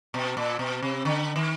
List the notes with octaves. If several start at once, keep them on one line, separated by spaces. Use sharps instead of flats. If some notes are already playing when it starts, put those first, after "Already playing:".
B2
A#2
B2
C3
D3
D#3